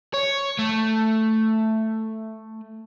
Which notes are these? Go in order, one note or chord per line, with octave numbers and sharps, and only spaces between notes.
C#5
A3